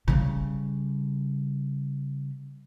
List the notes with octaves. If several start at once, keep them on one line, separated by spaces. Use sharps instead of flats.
C#3 G3